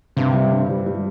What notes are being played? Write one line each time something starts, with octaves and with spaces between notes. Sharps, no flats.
G2 C3
G3
G2
G3
G3